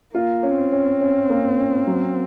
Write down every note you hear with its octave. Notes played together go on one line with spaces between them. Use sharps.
A#3 F4
C#4
C4
C#4
C#4
A#3
C#4
F#3